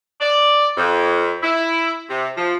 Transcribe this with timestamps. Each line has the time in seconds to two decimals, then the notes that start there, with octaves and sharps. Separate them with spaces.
0.21 D5
0.77 F2
1.43 E4
2.09 C3
2.37 F3